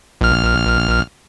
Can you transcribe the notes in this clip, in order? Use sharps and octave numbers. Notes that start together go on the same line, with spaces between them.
A#1 F6